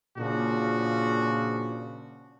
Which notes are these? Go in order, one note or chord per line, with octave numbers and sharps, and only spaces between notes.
A#2 C#3 F3 D4 F#4